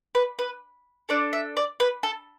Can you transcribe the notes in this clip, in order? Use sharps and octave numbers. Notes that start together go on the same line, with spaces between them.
B4
B4
D4 A4 D5
E5
D5
B4
A4